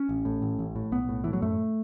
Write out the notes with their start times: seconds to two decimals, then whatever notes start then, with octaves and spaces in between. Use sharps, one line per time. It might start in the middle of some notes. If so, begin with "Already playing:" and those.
Already playing: C#4
0.09 A1
0.25 A2
0.42 A1
0.59 A1
0.76 A2
0.92 B1 B3
1.09 A2
1.24 A2 E3
1.33 F#3
1.42 F#2 A3